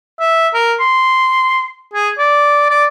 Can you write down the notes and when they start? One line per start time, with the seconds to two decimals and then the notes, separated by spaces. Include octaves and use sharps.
0.20 E5
0.54 A#4
0.80 C6
1.94 G#4
2.18 D5
2.70 D5